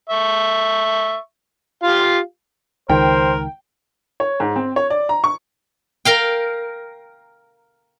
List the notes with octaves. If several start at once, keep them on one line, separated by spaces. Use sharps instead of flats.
E5 C#6
F4 G4 F5
C#2 D#3 A#4 C5 G5
C#5
G#2
C4
C#5
D5
A#5
C#6
A#4 F5 G5